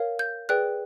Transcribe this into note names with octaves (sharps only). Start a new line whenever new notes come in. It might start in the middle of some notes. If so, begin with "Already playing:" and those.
Already playing: A#4 C#5 F5
G6
G#4 B4 D5 G5 F#6